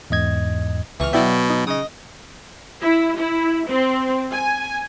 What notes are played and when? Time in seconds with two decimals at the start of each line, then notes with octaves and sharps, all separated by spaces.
0.10 E2 G#2 D#5 G#6
1.00 C#2 E3 C#6 F6
1.13 B2 F#3 E4 D5 E5 G5
1.50 D#4
1.67 C#3 D#5 D#6
2.82 E4
3.18 E4
3.69 C4
4.33 G#5